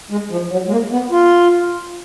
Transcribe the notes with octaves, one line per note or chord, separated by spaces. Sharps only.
G#3
F3
F#3
G#3
A#3
B3
F4